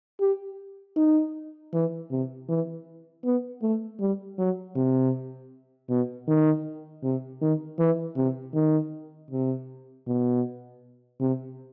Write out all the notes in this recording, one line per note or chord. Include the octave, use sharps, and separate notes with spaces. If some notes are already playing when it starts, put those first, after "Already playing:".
G4
D#4
E3
C3
E3
B3
A3
G3
F#3
C3
B2
D#3
C3
D#3
E3
C3
D#3
C3
B2
C3